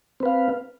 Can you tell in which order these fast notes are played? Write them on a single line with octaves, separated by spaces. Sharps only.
C4 B4 F5